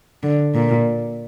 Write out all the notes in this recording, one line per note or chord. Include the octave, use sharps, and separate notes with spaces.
D3
A#2